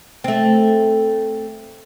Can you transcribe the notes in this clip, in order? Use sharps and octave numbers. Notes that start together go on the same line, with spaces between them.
A3 C4